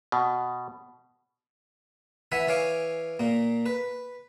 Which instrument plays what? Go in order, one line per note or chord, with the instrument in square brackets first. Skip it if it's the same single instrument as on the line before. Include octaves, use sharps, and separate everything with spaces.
[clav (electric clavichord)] B2
[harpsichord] E3 E5 F#5 G#5 B5
E3 C#5 F5 G#5 D6
A#2 A#3
B4